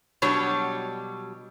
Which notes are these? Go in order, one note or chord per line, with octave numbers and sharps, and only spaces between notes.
B2 F#3 G3 D4 C#5